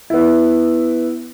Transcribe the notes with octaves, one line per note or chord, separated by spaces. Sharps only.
B3 E4